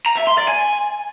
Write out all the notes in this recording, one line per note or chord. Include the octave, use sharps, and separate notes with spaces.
A#5
E5
C6
D5
G#5